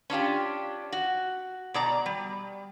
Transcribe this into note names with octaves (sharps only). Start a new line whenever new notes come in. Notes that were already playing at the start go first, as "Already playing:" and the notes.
C#4 D4 F4 G4
F#4
B2 D5 A#5
G3